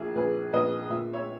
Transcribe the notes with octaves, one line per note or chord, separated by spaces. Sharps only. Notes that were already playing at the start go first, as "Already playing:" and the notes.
Already playing: A#1 A#2 E4 G#4
A#1 G#4 B4
A#1 B4 D#5
A#2 E5
C#5 E5